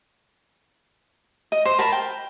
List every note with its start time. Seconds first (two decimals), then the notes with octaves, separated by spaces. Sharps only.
1.52 D#5
1.65 C5
1.79 A#4 A5 B5
1.92 G5